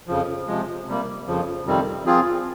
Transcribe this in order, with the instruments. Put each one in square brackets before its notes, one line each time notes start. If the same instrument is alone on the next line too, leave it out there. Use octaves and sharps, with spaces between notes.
[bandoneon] F2 C#3 F3
C3 F3 G#3
C3 G3 A#3
F2 C#3 F3
F2 C3 D#3 G3 C4
F3 C4 F4 G#4